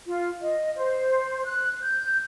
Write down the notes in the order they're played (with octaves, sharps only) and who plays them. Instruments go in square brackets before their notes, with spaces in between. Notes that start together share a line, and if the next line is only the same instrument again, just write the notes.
[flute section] F4
D#5
C5
F#6
G6